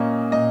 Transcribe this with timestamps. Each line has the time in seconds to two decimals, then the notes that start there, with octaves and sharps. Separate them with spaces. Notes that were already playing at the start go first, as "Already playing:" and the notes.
Already playing: A#2 A#3 C#4 D#5
0.32 A#2 D#5